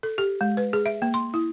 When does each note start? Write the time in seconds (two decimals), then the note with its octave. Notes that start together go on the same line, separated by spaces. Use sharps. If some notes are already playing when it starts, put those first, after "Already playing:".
0.03 A4
0.18 G4
0.41 G#3
0.57 B4
0.73 G#4
0.86 E5
1.02 A#3
1.14 C6
1.34 E4